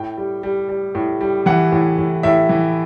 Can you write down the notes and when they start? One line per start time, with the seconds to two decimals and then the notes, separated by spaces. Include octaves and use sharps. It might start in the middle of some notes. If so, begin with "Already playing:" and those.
Already playing: A2 G5
0.17 G3
0.43 G3
0.69 G3
0.95 A2
1.21 G3
1.46 E3 F#5
1.72 A2
1.98 A2
2.23 A2 E5
2.49 E3